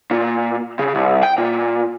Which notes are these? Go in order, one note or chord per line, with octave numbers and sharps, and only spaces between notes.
A#2
C#3
C2
G5
A#2